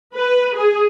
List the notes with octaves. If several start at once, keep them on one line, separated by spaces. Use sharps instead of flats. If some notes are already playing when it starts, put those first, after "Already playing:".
B4
G#4